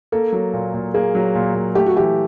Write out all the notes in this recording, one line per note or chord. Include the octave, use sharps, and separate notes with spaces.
A#3 A4
F#3
A#2
A#2
A#3 G#4
F#3
A#2
A#2
A3 G4
F#4
E3 G4